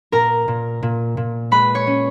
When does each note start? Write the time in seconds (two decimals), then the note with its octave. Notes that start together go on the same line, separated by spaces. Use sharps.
0.12 A#2 A#4 A#5
0.48 A#2
0.82 A#2
1.17 A#2
1.51 G#3 B4 B5
1.75 C#5 C#6
1.87 C#4